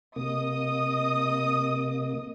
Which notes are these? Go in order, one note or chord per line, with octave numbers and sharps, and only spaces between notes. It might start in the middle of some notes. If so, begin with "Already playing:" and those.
C3 A#3 D#5 D#6